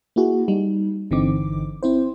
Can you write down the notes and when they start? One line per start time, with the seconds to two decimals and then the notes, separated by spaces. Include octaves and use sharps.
0.16 A#3 E4 F#4 G#4
0.48 G3 D#4
1.11 G1 D3 E3 C4 D#4 D6
1.83 C4 E4 C5